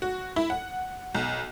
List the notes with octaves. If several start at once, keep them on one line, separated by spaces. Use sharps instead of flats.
F#4
E4
F#5
B1